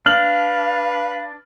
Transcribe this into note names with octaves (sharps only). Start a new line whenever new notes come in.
D4 B4 F5 F6 F#7